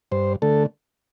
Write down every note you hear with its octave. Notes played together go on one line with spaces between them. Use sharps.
G2 C5
D3 A3 A4